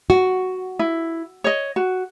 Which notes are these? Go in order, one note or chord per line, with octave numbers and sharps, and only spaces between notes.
F#4
E4
C#5 D#5
F#4